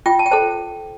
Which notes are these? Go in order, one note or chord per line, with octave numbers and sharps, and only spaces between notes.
F4 G5
A5
G5
A4 C5 A5